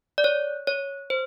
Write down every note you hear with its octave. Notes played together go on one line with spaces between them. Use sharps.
D5
C#5
C#5
C5